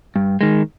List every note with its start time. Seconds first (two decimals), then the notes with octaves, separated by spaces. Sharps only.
0.16 G2
0.41 D#3 G#3